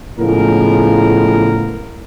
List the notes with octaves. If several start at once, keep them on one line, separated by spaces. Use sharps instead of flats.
A2 C#3 F3 G#3 B3 A#4